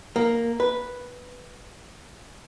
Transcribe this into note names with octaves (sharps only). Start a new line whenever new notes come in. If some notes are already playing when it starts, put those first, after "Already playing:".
A#3
B4